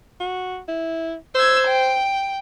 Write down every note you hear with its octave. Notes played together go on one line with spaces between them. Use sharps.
F#4
E4
C5 E6 G#6
G5